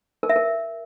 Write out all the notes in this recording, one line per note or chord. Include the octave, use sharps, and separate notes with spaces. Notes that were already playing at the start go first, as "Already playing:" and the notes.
A#4
E5
A#4